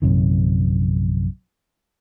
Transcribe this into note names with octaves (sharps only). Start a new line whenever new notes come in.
A#1 F#2 C3 D#3